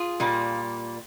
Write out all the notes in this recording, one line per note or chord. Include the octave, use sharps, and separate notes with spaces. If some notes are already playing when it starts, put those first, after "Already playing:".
Already playing: F4 G#4
A#2 G3 A#3